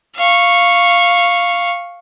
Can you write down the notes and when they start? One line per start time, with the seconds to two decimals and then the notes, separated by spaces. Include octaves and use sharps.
0.17 F5 C#6